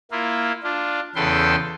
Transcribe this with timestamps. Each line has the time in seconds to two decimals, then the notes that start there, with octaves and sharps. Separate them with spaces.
0.11 A#3 E4 F4
0.63 D4 F4
1.15 E2 C#3 A4 B4 G5 C6